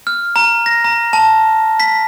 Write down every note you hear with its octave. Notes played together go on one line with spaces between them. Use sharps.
F6
A#5
A#6
A#5
A5
B6